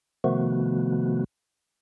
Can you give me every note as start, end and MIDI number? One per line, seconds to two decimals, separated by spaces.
0.24 1.24 48
0.24 1.24 51
0.24 1.24 53
0.24 1.24 57
0.24 1.24 59
0.24 1.24 66